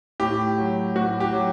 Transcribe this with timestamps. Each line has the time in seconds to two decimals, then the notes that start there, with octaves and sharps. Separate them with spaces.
0.20 A2 G4
0.58 F#3
0.95 A2 F#4
1.20 G4
1.33 F#3